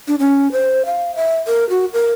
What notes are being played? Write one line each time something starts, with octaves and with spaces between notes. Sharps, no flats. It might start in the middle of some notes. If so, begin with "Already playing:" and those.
D4
C#4
C5
F5
E5
A#4
F#4
A#4